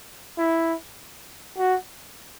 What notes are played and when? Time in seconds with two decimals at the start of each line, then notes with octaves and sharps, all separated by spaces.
0.38 E4
1.58 F#4